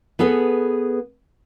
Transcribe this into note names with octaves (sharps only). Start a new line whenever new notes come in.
B3 G#4 A4 B4